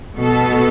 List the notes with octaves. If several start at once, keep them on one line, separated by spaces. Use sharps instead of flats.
B2 B3 A4